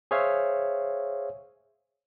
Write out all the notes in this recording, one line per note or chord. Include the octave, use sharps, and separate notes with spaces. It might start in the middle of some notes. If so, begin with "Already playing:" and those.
G#4 C5 C#5 E5 F5